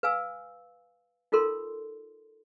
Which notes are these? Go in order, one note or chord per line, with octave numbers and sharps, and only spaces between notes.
B4 F5 G#5 E6
D#4 F4 A4 A#4 C6